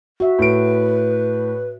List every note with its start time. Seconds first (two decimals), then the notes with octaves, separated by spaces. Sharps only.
0.20 F#4 E5
0.39 A2 B4 D7